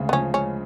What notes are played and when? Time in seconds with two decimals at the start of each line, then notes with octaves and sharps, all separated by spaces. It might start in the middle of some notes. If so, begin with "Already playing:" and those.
Already playing: D2 C#3 G#3
0.09 B3
0.13 F3 C#4
0.34 G#3 C#4